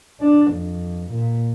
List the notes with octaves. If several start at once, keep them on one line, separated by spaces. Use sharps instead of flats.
D4
F2
A#2